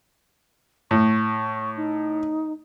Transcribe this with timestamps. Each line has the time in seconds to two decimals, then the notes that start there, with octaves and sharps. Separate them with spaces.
0.91 A2 C#6
1.77 D#4